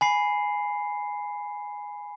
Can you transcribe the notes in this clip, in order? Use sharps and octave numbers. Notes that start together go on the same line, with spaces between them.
G#5 B5 C7